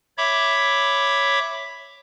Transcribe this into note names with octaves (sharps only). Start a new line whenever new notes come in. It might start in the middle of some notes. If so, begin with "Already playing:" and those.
C#5 E5 B5 D6